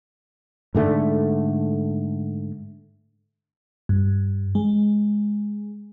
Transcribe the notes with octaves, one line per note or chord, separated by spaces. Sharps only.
G#2 D3 A3
G2
G#3